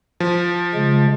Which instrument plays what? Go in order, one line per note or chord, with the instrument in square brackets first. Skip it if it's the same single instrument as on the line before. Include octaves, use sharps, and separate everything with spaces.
[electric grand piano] F3
[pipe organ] C#3 G#3